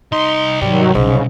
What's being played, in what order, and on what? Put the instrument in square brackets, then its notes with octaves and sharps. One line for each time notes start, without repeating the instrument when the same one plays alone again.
[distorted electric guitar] C2 C6 [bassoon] D#4
[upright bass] G#2 [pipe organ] D#3 F#3 [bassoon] G3
[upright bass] F#1 B1 [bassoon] G#2 [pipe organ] C#3